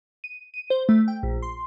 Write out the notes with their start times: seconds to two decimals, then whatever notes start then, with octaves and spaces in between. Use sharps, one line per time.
0.24 D#7
0.54 D#7
0.70 C5
0.89 A3
1.08 G5
1.23 A#1
1.42 C6